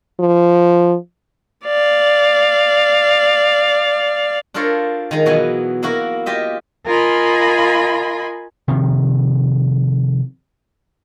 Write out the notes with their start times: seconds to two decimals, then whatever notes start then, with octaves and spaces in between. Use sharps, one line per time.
0.20 F3
1.65 D5 F5
4.54 D4 F4 A4 A#4 C5 C#5
5.11 D#3 F3 G#3 D#4
5.26 B2 E3 F#3 B3 D#5 G#5
5.83 A#3 E4 F#4 A#4
6.26 F4 G4 D#5 E5
6.86 F4 A#4 D#5 G#5 B5 C6
8.68 C3 D#3 F3